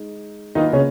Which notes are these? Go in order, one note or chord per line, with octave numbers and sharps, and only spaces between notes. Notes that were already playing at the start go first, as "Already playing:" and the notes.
Already playing: G#3 D#4
D#3 F#3 A#3 D#4 F4 B4 D#5
C#3 C#4